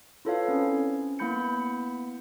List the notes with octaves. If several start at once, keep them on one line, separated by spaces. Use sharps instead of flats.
E4 F4 A4 B4 C#5 F5
C4 C#4
A#3 B3 E4 B5 G6 C#7